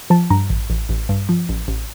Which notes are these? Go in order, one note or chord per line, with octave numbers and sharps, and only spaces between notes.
F3 A5
G2 A#5
A1
A1
A1
G2
F3
A1
A1